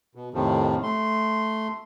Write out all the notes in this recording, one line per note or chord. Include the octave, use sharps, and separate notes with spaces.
B2
F2 A2 C3 D#3 F3
A3 C6